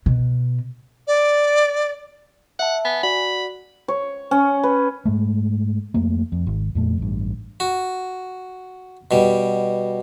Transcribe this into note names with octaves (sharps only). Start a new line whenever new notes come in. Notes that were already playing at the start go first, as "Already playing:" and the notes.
B2
D5
E5 F#5 A5
B3 G#5
F#4 D5 F#5 B5
C#5
C#4
B4
G#2 G#3 A3
F2 A3 A#3
F2
G#1
F2 A#2 A3
A1 G2
F#4
B2 G3